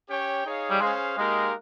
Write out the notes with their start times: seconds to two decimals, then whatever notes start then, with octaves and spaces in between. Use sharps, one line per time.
0.08 C#4 G4 C#5 G5
0.44 D#4 G#4 C#5 F5
0.70 G3
0.80 G#3 C#4 G#4 C5 F5
1.17 G#3 A#3 D#4 G4 A#4 F5